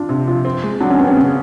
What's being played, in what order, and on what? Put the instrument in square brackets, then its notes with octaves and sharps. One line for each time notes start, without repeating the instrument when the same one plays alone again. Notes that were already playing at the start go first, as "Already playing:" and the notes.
Already playing: [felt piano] D4 F4
[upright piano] C3
F3
C4
G#3
[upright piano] F#3 [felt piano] D4
[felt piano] C#4
[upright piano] B3 [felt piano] C4
[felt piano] C#4
[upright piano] C#3